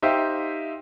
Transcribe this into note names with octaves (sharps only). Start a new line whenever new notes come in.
D#4 G4 C5 E5 F5